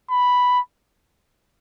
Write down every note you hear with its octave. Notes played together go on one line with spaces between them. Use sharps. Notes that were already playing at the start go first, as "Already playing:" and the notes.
B5